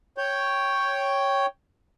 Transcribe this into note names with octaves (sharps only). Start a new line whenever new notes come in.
C#5 G5